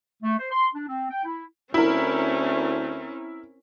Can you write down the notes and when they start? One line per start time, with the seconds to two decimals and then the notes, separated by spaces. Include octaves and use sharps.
0.23 A3
0.40 C5
0.52 C6
0.75 D4
0.88 C4
1.11 G5
1.25 E4
1.74 D2 C4 C#4 E4 A#4